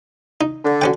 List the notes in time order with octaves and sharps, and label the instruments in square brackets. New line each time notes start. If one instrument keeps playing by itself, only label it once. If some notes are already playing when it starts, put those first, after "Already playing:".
[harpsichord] D#4
[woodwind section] D3
[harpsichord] F#3 C#4 G5